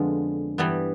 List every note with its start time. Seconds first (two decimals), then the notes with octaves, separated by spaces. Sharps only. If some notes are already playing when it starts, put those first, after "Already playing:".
Already playing: F2 D3 F3 G#3 B3
0.58 G2 E3 G3 B3